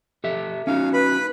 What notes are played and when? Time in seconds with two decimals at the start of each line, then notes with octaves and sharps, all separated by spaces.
0.24 G4 A4 E5
0.67 C#4 D#4 F#4 F5
0.93 B4 B5